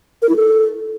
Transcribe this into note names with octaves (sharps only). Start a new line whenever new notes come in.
A#4
E4
A4